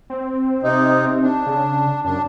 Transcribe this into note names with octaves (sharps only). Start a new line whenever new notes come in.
C4
C3 D#4
D4
C#3
F#2 D4